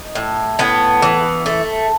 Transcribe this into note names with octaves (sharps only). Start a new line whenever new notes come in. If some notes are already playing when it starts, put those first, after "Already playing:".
Already playing: D#4
A2
A2 B3
E3
A3